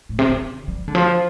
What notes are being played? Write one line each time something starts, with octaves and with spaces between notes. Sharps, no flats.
A2
C3
D3
G3
D3
F3